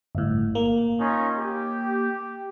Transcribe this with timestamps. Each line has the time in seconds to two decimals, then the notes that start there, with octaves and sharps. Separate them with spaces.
0.15 G1 A2
0.55 A#3
0.99 C#4 D#4 F4
1.39 G4